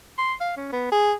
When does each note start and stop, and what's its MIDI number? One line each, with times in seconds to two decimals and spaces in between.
0.18 0.33 84
0.41 0.54 77
0.57 0.69 61
0.72 0.89 59
0.92 1.13 68